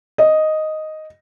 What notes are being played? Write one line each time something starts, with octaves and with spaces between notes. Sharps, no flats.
D#5